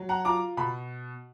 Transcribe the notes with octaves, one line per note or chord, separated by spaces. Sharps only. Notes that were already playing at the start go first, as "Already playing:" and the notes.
Already playing: F#3
F#5 A#5
F4 A#5 D6
B2 B5